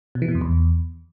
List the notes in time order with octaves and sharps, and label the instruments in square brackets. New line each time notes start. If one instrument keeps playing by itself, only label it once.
[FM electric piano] B2
E3
B2
F2
E2